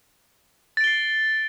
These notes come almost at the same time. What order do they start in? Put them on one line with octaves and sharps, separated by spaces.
A6 D7 G7 C7